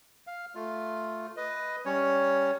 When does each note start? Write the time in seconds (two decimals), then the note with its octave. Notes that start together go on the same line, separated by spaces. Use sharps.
0.27 F5
0.55 A3 F4
1.37 B4 D#5
1.85 G3 C#4 C#5